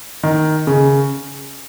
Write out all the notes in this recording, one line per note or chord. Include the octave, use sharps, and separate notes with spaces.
D#3
C#3